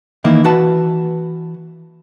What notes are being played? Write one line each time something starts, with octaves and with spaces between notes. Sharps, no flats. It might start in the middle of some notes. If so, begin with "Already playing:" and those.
D#3 E3 A#3 D#4 E4
E3 F#4 B4 F#5 A5